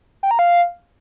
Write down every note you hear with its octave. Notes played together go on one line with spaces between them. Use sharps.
G5
A#5
F5